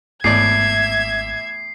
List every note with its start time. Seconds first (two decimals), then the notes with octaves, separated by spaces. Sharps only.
0.24 G#1 E2 A2 D5 E5 G#6 C7